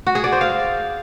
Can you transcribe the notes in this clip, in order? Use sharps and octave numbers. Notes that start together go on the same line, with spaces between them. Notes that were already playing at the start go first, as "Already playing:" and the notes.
F#4
G#4
D5
C5
F5